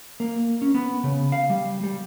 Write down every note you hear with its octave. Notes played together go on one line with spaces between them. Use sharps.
A#3
C#4
B3
C#3
F5
G3
G3